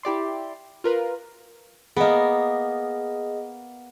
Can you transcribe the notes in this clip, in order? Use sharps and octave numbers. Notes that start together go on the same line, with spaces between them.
E4 G4 D5 C6
F4 A#4 B4
A#3 B3 G#4 D#5